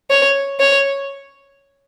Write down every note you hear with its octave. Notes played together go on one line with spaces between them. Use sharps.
C#5
C#5